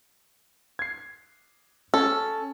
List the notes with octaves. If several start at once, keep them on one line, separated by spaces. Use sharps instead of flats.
G#6 C7
C#4 A4